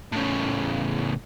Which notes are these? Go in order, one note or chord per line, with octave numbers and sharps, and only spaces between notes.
A2 C#3